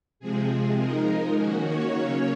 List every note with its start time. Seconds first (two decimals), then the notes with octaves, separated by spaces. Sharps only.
0.20 C3 F3 G#3 C4 G#4
0.49 G#4
0.78 F3 G#3 D#4 A#4
1.35 D#3 A#3 C#4 F#4
1.64 C#5
1.93 C#3 F#3 A#3 C#5